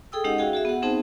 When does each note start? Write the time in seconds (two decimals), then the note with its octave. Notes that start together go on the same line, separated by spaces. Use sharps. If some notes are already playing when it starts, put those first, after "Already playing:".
0.12 G#4 A4 G5 D#6 E6
0.24 G#3 C#4 D#4 G4 D#5 F#5
0.38 F#4 G#4 F5 G5
0.53 F#4 G#4 E5
0.65 B3 F#5
0.82 B3 C4 D#4 G#4 C5 A5